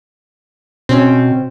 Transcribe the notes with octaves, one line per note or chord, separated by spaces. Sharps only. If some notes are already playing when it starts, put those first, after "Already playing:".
B2 C4 C#4